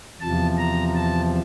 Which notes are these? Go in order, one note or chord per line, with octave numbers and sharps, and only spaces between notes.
E2 C3 F3 A5
A#5
A5